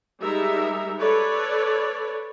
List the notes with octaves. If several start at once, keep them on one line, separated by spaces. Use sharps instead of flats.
G3 G#3 D#4 A#4 E5
A4 B4 C#5 D5